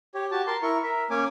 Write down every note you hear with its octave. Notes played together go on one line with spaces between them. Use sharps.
G4 C#5
F#4 G4 A5
A#4 A5 C6
E4 A#4 C#6
A#4 E5
A#3 C#4 C#5 G#5 D6